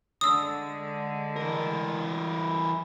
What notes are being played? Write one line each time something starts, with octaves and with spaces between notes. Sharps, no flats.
D3 G#3 D#6 E6
E3 A#4